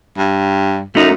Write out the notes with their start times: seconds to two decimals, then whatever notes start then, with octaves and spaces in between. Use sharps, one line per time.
0.18 G2
0.95 F#2 A3 D#4